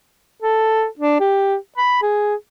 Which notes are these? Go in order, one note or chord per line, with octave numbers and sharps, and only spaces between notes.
A4
D4
G4
B5
G#4